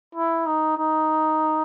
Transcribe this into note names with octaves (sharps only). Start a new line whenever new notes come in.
E4
D#4
D#4